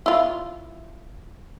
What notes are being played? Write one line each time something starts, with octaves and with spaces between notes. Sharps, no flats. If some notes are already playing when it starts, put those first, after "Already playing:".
E4 F4